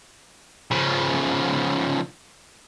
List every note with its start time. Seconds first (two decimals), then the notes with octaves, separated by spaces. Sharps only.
0.71 C#3 F3